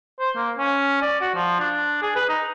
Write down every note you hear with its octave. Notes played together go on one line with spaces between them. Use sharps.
C5
A#3
C#4
D5
F#4
F3
D4
G#4
B4
D#4